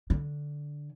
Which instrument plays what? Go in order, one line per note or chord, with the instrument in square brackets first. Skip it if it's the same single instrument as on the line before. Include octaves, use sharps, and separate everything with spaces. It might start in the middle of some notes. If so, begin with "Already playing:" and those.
[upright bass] D3